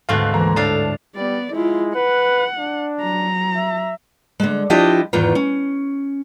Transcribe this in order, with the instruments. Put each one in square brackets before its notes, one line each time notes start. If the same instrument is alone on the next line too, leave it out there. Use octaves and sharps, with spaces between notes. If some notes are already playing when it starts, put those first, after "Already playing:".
[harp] D2 G#2 [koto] B2 A3 C4 [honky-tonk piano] F5 F#6
[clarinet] E3 [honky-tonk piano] A#3 A#5 C6
[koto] A2 D4 F5 [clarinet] A4 [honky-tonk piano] A5
[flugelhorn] G3 [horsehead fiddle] B3 D5
[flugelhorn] G#3 [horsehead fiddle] E4 F4
[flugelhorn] B4 [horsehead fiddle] F#5
[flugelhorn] D4
[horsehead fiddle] F#3 A#5
[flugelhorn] E5
[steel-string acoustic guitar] D3 G#3
F3 D4 E4 F4 G4 D#5
E2 G#2 D#3 E3 F4
C#4